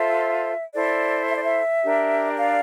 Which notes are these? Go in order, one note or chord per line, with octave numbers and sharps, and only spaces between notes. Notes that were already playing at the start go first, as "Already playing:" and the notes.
Already playing: F4 A4 C5 E5
E4 A4 C5 D5
E5
D5
E5
D4 G4 A#4
D5 F5